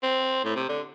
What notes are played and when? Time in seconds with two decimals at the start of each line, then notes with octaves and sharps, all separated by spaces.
0.03 C4
0.44 A2
0.56 C3
0.69 D3